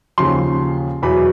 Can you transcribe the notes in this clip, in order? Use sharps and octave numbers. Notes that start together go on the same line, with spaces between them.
D#2 C#3 F3 C6
E2 B2 F#3 B5